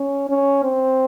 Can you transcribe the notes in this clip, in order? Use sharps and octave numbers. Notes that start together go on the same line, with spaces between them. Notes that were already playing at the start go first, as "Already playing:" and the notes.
Already playing: C#4
C#4
C4